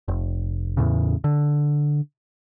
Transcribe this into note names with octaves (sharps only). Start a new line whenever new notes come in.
F1
E2 A2 C#3
D3